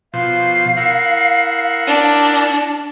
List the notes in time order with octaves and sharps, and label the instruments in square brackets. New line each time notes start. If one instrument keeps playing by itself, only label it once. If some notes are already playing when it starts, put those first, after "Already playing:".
[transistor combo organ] B2 F3 C5 [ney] F5
[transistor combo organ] E4 A#4 F#5
[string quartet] D4